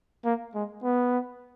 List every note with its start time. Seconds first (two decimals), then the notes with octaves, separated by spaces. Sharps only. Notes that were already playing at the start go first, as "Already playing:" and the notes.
0.25 A#3
0.55 G#3
0.84 B3